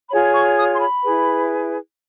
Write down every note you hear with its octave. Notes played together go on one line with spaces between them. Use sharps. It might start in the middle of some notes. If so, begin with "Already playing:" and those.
F4 G#4 C#5 B5
C#6
D#6
C6
B5
E4 G#4 B4